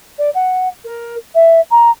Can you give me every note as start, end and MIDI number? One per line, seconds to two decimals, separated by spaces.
0.18 0.30 74
0.34 0.68 78
0.84 1.15 70
1.34 1.60 76
1.71 1.90 82